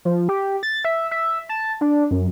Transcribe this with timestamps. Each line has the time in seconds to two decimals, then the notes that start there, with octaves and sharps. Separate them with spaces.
0.05 F3
0.29 G4
0.63 A6
0.85 E5
1.11 E5
1.49 A5
1.81 D4
2.11 F#2